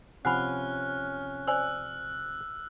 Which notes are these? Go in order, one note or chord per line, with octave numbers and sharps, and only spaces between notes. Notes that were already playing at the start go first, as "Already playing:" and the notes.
C3 F3 C#4 F#5 G#5 B5 F6 F#6
C5 D5 G#5 E6 F#6